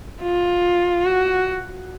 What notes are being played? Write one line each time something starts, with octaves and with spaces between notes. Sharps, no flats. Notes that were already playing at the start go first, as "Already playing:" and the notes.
F4
F#4